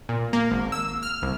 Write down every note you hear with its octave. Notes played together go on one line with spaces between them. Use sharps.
A#2
A#3
G#1
E6
F6
C2